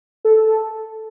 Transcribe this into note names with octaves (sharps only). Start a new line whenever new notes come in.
A4